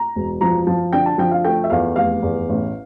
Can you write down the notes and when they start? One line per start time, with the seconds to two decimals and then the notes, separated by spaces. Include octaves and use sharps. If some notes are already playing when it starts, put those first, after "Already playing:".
Already playing: A#5
0.15 E1
0.41 F3 A#5
0.67 F3 A5
0.93 D3 G5
1.06 A5
1.18 F3 G5
1.31 F5
1.45 A3 G5
1.64 E5
1.70 E2 F5
1.96 F1 F5
2.22 E2
2.49 A1